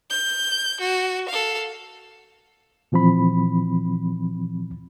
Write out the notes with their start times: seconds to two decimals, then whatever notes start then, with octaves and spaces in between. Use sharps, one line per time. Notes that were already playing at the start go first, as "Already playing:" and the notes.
0.10 G6
0.81 F#4
1.29 A4 F5
2.92 A#2 E3 F3 C4 B5